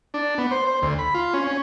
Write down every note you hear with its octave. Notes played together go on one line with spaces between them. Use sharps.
D4
B3
C5
C5
D2
B5
F4
C#4
C#4